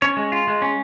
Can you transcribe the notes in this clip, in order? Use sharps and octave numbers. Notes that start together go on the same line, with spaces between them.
C#4 C#5
G#3
F4
G#3
C#4